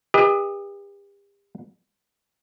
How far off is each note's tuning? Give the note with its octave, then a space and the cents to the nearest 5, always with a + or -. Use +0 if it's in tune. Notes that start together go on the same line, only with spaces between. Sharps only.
G4 +40 B4 -25 D#5 +25